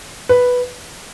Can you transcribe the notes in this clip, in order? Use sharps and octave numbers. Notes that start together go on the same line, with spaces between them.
B4